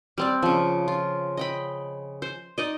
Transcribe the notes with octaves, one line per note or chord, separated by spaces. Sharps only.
G3 C4 D5
C#3 F3
F4
D#5 G5 B5
C5
D#4 D5 D#5